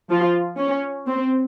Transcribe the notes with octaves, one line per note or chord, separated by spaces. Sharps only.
F3 F4
C#4
C4